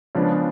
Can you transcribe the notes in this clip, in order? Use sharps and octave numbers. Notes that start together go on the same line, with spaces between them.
C#3 F3 G#3 B3 D4